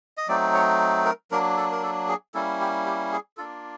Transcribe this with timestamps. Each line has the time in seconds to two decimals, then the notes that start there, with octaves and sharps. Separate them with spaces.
0.17 D#5
0.28 F#3 A3 C4 D#4 D5
0.54 C#5
1.05 A#4
1.31 F#3 A#3 D4 A#4
1.57 A4
1.72 A#4
1.83 A4
2.08 G#4
2.34 G3 A#3 C#4 E4 A4
2.61 G4
2.86 G4
3.12 G#4
3.37 A#3 D4 F4 A4